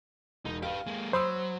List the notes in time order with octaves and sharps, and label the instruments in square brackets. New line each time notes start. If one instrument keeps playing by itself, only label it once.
[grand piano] E1 [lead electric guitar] D#4
[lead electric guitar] G4 B4 [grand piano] F5
[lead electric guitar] G#3 A#3
[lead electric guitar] F#3 [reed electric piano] C5 [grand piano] B5 D#6 E6